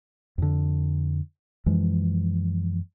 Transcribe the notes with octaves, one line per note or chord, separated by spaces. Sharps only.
F2 D3
F#2 E3 F3 G#3